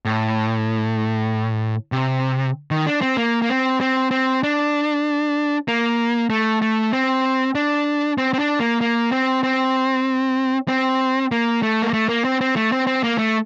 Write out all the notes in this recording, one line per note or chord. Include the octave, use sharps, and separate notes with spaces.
A2
C3
D#3
D4
C4
A#3
A#3
C4
C4
C4
D4
A#3
A3
A3
C4
D4
C4
C4
D4
A#3
A#3
C4
C4
C4
A#3
A3
A#3
A3
A#3
C4
C4
A3
C4
C4
A#3
A3